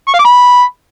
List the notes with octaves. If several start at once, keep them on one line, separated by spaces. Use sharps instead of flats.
C#6
F5
D6
B5